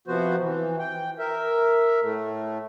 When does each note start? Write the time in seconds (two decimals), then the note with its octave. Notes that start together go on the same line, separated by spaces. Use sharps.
0.08 C3 F3 B3 F#4 C5
0.41 E3
0.79 G5
1.19 A#4 E5
2.03 A2 A3